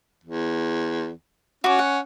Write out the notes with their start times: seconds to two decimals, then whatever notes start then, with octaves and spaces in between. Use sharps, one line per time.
0.24 E2
1.64 C#4 F#4 D6
1.79 F#5